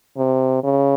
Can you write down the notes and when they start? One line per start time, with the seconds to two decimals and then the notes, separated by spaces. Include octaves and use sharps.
0.17 C3
0.64 C#3